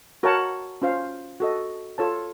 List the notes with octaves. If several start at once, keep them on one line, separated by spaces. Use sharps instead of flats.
F#4 A#4 C#5 F#5 A5
C#4 F4 C5 F5
F#4 A4 D#5
F4 A4 C#5 A5